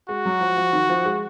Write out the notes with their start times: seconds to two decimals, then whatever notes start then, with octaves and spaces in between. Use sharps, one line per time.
0.09 G#3 F#4
0.26 F#3
0.41 F3
0.57 F3
0.73 D#3
0.89 F3
1.06 G#3